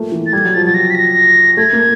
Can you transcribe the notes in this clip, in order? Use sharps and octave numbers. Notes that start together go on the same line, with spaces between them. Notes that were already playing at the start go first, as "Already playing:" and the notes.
Already playing: F3 G3 A3 A#3
E3
A6
G3 G#6
F#3
F3 A6
F#3 A6
A#6
B6
A#6
A3 G#6
A#3